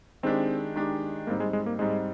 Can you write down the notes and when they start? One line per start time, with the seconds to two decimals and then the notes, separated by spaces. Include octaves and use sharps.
0.23 D#3 G#3 C4 D4 G4
0.76 D#3 G#3 D4 G4
1.27 G#2 G3 A#3 C4 D#4
1.40 G#3
1.53 G#3
1.66 A#3
1.79 G#2 G3 G#3 C4 D#4